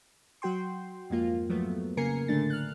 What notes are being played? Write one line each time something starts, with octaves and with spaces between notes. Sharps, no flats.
F#3 F#4 G5 C6
F2 G#2 A#3 F4
F3 F#3 A3 B3
C#3 A#3 A#4 G#5 C7 C#7
A1 D3 A3 D4 A6
F6 F#6